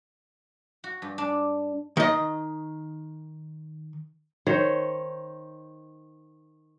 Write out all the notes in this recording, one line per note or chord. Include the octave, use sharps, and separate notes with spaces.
F#4
G2
D4
D#3 D#5
D#3 C5 C#5